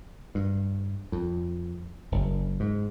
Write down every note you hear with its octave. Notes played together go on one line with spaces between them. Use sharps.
G2
F2
F#1
G#2